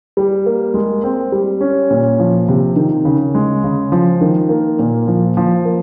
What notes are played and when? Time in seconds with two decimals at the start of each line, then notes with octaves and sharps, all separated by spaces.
0.17 G3
0.46 A#3
0.74 G#3
1.03 C4
1.32 G3
1.61 C#4
1.90 A#2
2.20 F3
2.48 C3
2.76 D#3
3.05 C#3
3.35 G#3
3.64 C#3
3.92 F3
4.21 D#3
4.49 A#3
4.79 A#2
5.07 F3
5.37 F3
5.65 A#3